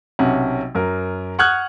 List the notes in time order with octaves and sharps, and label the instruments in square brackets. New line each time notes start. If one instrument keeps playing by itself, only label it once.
[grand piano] B1 C3 C#4 F#5
F#2 A#4
F#5 C#6 D#6 F6 F#6 G#6